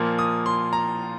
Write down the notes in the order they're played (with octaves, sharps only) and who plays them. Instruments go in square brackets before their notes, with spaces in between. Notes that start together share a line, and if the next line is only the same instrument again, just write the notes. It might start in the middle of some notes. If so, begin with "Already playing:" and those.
Already playing: [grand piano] A#2 F3 A#3
D#6
C6
A#5